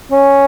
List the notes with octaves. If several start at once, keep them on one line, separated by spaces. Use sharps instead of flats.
C#4